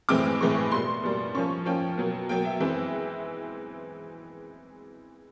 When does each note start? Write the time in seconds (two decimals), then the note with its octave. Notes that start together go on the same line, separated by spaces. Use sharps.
0.09 A2 E3 G#3 C4 D6
0.40 A2 E3 G#3 C4 C#6
0.71 B2 G3 A#3 C6
1.03 B2 G3 A#3
1.34 F3 A#3 C#4 C#6
1.66 F3 A#3 C#4 G5
1.97 B2 F#3 A#3
2.29 B2 F#3 A#3 G5
2.45 E5
2.60 E3 G#3 C4 E5